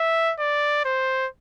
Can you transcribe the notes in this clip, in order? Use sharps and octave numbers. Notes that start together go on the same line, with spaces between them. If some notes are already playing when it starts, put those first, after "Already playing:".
Already playing: E5
D5
C5